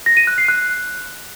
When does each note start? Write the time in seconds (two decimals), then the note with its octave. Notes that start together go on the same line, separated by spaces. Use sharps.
0.06 A#6
0.17 D#7
0.27 F#6
0.38 C7
0.48 F#6